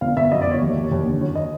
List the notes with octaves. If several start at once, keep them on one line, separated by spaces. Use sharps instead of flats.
G1 F5
G1 E5
F#2 D#5
D5
G1 C#5
D#2
D#2
D#2
D3
F#2 C#5
D#5